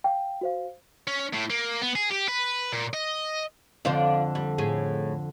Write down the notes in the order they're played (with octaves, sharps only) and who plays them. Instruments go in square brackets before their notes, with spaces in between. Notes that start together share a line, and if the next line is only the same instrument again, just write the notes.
[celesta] F5 G5
F#4 C5 F5
[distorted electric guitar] C#4
A2
A#3
B3
G#4
G4
B4
A#2
D#5
[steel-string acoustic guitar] F2 D3 [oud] D4 F4 C5
[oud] G3
A2 G#4